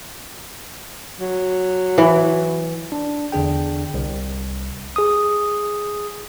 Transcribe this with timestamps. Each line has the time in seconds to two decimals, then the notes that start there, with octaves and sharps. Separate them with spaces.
1.20 F#3
1.98 E3
2.92 D4
3.32 E2 D3 D4 G#4 G5
3.94 C2
4.96 G#4 D#6